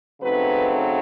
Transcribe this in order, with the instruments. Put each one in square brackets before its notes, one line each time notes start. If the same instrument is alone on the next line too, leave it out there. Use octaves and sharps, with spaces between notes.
[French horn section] C#3 F#3 A3 C4 D#4 B4